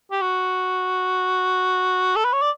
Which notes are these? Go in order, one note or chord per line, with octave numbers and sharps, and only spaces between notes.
G4
F#4
A4
B4
C#5
D5